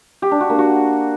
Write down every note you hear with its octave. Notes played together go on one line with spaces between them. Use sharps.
G4
D4
F#4
A#3
F#4